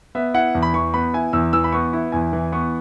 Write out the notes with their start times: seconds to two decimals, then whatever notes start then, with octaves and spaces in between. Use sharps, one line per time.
0.15 B3 E5
0.34 E4 F#5
0.55 E2
0.63 B5
0.74 E3 C#6
0.94 B3 B5
1.14 E4 G#5
1.33 E2 E6
1.53 E3 E6
1.64 B5
1.72 B3 C#6
1.93 E4
2.12 E2 G#5
2.33 E3
2.52 B3 C#6